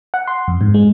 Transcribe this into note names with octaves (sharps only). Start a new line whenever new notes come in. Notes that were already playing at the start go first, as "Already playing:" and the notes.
F#5
C6
F2
G#2
G#3